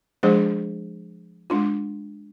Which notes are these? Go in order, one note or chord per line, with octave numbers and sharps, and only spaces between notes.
F3 G#3 D4 G#4 C5
G#3 D4 F4